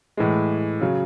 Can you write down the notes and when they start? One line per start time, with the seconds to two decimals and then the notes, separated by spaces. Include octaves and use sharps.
0.17 A2 E3 G#3
0.81 C#3 F#3